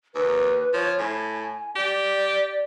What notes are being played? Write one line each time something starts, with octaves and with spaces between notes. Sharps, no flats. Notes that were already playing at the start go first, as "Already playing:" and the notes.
D#2 B4
F3 C#5
A2 G#5
G4 D5